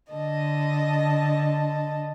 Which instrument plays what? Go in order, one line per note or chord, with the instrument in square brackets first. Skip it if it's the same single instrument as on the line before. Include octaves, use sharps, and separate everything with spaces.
[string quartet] D3 D#5 A5